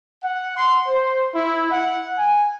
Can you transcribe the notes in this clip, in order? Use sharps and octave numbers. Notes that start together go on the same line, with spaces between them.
F#5
C6
C5
E4
F#5
G#5